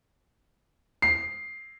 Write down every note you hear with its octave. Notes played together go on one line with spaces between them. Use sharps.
C7